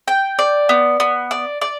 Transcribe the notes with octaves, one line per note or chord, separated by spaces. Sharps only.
G5
D5
B3
B3
D5
D5